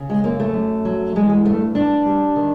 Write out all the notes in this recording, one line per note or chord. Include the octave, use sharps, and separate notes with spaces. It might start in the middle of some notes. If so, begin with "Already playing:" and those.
Already playing: C#3
G#3
F#2 A#3
A3
F#2
F#3
E3 G#3
G#3
G2 A3
G2 D4
G3
D#3